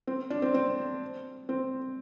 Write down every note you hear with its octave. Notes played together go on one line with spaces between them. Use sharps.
C4
D4
C4
C4
C4